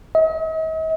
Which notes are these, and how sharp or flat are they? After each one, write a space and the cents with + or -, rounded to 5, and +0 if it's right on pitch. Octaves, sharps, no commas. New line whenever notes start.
D#5 +45